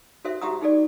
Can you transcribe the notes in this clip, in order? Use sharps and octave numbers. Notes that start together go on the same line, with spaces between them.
F#4 A4 C5 E5
F#4 G4 E5 A#5 D#6
D#4 G#4 A4 D5